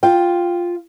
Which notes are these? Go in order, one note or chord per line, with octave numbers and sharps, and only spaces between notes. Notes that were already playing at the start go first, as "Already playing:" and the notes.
F4 G5